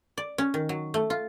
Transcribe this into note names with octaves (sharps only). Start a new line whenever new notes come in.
D5
C#4
D#3
F#3
A3
F4